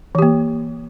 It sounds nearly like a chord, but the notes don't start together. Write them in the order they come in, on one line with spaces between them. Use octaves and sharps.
E3 G4 A#3